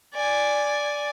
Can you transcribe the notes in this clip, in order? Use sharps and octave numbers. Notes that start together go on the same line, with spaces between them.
D5 G#5